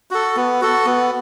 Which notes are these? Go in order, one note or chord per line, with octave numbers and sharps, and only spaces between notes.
F#4 A4
B3
F#4 A4
B3